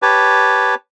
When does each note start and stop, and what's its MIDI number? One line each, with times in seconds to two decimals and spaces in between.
0.02 0.75 67
0.02 0.75 71
0.02 0.75 73
0.02 0.75 81